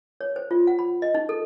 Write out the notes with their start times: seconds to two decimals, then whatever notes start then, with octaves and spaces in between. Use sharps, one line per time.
0.21 C#5
0.36 C5
0.51 F4
0.67 F#5
0.79 B5
1.02 D#5
1.15 D#4
1.29 A4